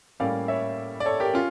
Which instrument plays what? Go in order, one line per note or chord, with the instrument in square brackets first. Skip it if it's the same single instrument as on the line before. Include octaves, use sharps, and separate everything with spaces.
[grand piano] A2 G3 A#3 C#4 D5 F5
C#5 E5
D5
A4 C#5
G4 A#4
C#4 F4